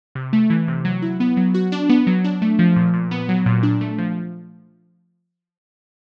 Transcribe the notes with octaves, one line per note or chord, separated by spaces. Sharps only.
C3
A3
E3
C3
F#3
E4
B3
F#3
F#4
D4
B3
F#3
D4
A3
F3
A#2
A#2
B3
F#3
A#2
D4
A3
F3